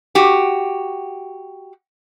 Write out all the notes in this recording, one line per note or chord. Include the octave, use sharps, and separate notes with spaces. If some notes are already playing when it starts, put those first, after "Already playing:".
F#4 G4